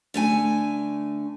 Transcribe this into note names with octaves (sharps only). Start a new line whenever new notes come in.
D3 A3 G#5